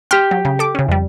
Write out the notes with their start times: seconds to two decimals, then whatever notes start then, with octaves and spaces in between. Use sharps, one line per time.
0.11 G4 G5 C6 F6
0.31 F#3
0.45 C#3
0.59 A4 D6
0.75 C#3 C#4
0.88 F2 G3